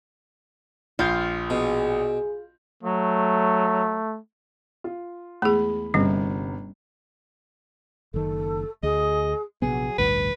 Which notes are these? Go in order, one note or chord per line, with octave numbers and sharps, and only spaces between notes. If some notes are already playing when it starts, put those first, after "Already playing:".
A#1 F4 G6
B2 G#4
F#3 A3
F4
E2 G#3 A3 G#4 B5
G1 C3 G3 C#4
F#1 D#3 A4
D2 G#4 D#5
A#1 C3 F#3 B3 G#4
A1 D2 G2 B4